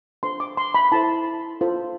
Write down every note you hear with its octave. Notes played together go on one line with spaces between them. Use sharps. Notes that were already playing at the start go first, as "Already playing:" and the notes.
D4 F4 A4 C5 C6
D6
C6
B5
E4 A4 C5 A5
F4 A4 C5